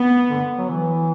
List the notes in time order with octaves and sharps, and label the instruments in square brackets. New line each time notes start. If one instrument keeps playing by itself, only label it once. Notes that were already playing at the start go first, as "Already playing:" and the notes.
Already playing: [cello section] B3
[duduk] D3
F#3
E3